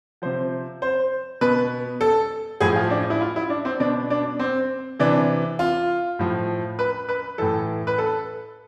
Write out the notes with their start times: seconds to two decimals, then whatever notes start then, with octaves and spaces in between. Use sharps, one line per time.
0.22 C3 F3 C5
0.82 C5
1.41 B2 B4
2.01 A4
2.60 A2 F3 G#4
2.76 F4
2.91 D4
3.10 E4
3.21 F4
3.36 E4
3.50 D4
3.65 C4
3.80 B2 D4
4.10 D4
4.39 C4
4.99 C3 E3 D4
5.59 F4
6.19 A2 F3
6.79 B4
7.09 B4
7.38 A2 E3 A4
7.87 B4
7.98 A4